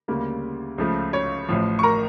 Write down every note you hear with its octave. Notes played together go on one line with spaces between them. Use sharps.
D2 C#3 G3 A#3
C#2 C#3 F3 A3
C#5 C#6
A1 A2 F3
C#6
A#4 A#5